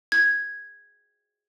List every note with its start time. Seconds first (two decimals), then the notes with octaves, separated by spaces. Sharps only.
0.12 G#6